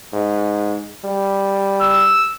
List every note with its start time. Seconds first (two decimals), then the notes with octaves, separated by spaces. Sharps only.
0.13 G#2
1.04 G3
1.80 E6